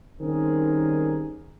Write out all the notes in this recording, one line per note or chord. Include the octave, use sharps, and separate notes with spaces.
D#3 G3 C4 C#4 G#4 A#4